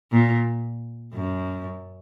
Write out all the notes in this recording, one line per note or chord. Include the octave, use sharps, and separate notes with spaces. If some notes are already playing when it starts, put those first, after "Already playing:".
A#2
F#2